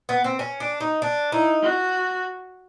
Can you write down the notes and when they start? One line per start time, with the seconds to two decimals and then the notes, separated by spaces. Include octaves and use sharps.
0.09 B3
0.24 C4
0.39 C#4
0.60 D4
0.80 D#4
1.02 D4
1.32 D#4 E4
1.63 F#4